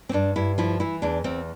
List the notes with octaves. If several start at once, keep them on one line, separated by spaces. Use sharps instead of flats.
C4
G2 D4
G2 E4
F3 E4
E3 E4
E2 D4
E2 C4